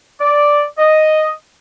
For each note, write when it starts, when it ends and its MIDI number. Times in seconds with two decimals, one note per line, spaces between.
0.21 0.64 74
0.79 1.30 75